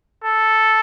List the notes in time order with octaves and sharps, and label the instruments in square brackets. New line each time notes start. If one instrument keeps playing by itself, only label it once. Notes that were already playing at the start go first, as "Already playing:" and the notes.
[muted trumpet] A4